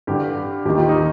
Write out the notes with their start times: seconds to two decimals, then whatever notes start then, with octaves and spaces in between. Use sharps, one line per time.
0.07 G2 D3 G4
0.65 D#2 D#3 G4
0.77 F4
0.89 D#4